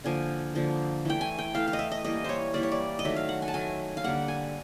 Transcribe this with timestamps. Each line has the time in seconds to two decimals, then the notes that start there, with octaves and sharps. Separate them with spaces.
0.04 D3 F3 A#3 G#5
0.55 D3 F3 A#3
1.05 E3 A3 G5
1.21 G#5
1.38 G5
1.54 E3 A3 F5
1.68 F5
1.73 D#5
1.79 E5
1.92 D#5
2.04 E3 G3 A#3 D#5
2.24 C5 C#5
2.54 E3 G3 A#3 D5
2.63 C#5
2.72 D5
2.99 D#5
3.05 D#3 F#3 A3 E5
3.16 F5
3.29 F#5
3.42 G#5
3.48 A5
3.54 D#3 F#3 A3 G#5
3.97 F5
4.04 D3 G3 A#3 F#5
4.28 G#5